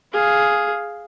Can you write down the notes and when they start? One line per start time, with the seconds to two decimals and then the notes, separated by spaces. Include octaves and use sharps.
0.13 G#4 F5